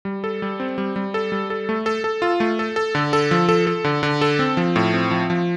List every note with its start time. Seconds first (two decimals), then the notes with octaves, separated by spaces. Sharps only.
0.05 G3
0.24 A4
0.42 G3
0.60 C4
0.78 G3
0.96 G3
1.14 A4
1.32 G3
1.50 A4
1.69 A3
1.86 A4
2.04 A4
2.22 F4
2.40 A3
2.59 A4
2.76 A4
2.95 D3
3.13 A4
3.31 F3
3.49 A4
3.67 A4
3.84 D3
4.03 D3
4.21 A4
4.39 C4
4.57 F3
4.76 A2
4.94 C4
5.11 F3
5.30 F3